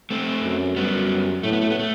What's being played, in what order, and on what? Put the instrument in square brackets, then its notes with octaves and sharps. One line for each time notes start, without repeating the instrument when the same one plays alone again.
[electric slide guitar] A3 C4
[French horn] F#2
[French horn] F#2 [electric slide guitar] G3 B3
[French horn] A2 [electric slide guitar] A3
[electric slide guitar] B3
A3
B3
A3